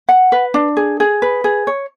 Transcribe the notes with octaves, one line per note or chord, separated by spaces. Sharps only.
F#5
B4
D4
G#4
G#4
B4
G#4
C#5